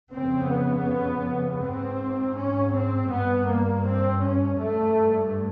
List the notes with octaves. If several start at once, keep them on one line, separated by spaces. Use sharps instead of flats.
F2 C#3 C4
B3
G#2 C4
C#4
C4
G2 B3
A#3
C4
C#4
G2 A3